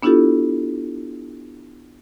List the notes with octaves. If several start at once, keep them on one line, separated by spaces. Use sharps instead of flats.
B3 D4 E4 F4 G4 A4